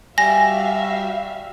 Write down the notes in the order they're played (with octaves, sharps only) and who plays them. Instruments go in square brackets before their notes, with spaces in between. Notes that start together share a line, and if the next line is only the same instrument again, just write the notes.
[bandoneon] G3 [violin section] F#4 E5 F5 [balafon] G#5 [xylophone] A#6